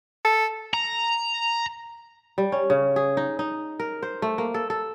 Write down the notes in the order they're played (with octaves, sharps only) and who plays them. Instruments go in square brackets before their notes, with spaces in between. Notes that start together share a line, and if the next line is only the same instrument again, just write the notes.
[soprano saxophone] A4
[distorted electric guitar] A#5
[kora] G3
C#4
C#3
G#4
D#4
D#4
A#4
C5
A3
A#3
A4
A4